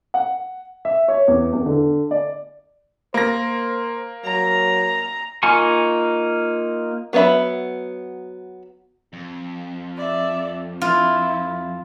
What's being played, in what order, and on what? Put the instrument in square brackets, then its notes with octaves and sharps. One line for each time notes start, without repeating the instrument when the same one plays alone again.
[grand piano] F#5
E5
C#5
E2
E2
D3
D5
[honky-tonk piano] A#3 A#6 [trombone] C5
[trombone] F#3 [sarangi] A#5
[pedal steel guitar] A#3 D#4 F4 G#5 C#6
[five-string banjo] F#3 B3 A#4 E5 B5
[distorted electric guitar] F2
[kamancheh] D5 E5
[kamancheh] E4 [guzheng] F4